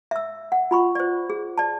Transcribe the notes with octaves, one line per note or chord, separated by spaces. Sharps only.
E5 E6
F#5
F4 B5 C#6
C5 D5
G#4
D5 A5